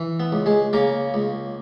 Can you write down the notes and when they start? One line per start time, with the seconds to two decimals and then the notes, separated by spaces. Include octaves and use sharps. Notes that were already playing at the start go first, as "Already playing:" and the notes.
Already playing: E3
0.20 B3
0.32 C#2
0.46 G#3 G#4
0.73 C#3 A#3 A#4
1.14 C#2